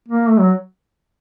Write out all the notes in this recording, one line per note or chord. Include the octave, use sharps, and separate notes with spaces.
A#3
A3
F#3